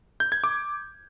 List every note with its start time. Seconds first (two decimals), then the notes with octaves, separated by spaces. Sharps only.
0.20 G6
0.32 G#6
0.44 D6